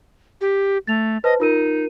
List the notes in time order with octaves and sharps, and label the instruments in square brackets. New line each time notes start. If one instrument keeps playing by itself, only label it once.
[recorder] G4
[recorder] A3 [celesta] A6 F7
[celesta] B4 C5 A5 [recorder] D#5
[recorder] D#4 [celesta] F4 A#4 D#7